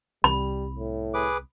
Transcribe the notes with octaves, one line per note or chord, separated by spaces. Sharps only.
C2 G3 B5
A2
G#4 B4 D6